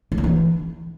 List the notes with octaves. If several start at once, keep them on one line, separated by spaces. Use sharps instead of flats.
A#3
D4
E3